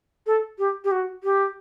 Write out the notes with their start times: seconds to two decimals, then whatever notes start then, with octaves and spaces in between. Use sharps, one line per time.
0.26 A4
0.58 G4
0.84 G4
0.91 F#4
1.23 G4